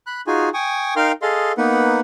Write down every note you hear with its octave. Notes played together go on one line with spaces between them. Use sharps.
B5 F#6
D#4 F4 F#4 G#4 G#5
G5 G#5 C#6 D#6
D#4 A#4 F5 G5 C6 F6
G#4 A4 D#5 F5 C6
A#3 B3 D#4 B4 F#5